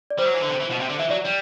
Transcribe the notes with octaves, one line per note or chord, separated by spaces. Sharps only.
D5
G3 C5
F#3
E3
D3
C3
E3
B2
C3
D3
E3 E5
F#3 D5
G3